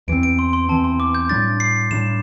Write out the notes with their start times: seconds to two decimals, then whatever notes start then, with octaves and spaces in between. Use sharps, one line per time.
0.08 E2 E3 C4 D7
0.23 D7
0.39 C6
0.53 C6
0.69 E2 E3 C4 A5
0.84 C6
1.00 D6
1.15 G6
1.29 A2 G3 D4 A6
1.60 C7
1.91 A2 G3 D4 E7